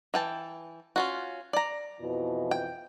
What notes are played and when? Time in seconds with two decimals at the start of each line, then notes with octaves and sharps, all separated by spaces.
0.14 E3 G5 A5
0.96 C#4 F4 F#4
1.53 D5 A#5
2.00 F2 B2 E3
2.51 G5